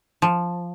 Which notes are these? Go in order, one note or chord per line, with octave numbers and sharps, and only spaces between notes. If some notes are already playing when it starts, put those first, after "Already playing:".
F3